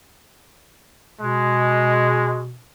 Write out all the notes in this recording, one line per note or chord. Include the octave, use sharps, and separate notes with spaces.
B2 G#3